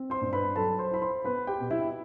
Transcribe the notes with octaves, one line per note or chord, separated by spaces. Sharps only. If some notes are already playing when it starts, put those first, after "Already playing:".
Already playing: C4
C5 C6
G2
B4 B5
F#3 A4 A5
C5 C6
E4 B5
C5 C6
B3 B4 B5
G4 G5
B2
E4 E5